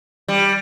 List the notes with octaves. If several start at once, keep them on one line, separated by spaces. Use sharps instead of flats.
G3